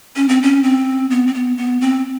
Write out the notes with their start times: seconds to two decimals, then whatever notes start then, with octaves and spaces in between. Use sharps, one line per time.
0.16 C#4
0.29 C4
0.42 C#4
0.63 C4
1.10 B3
1.27 C4
1.34 B3
1.57 B3
1.81 C4